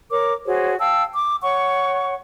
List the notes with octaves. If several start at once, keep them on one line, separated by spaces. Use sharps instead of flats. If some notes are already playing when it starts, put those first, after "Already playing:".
A#4 C#5 D6
F#4 G#4 C5 C#5
F5 G5 A5 E6
D6
C#5 F#5 C#6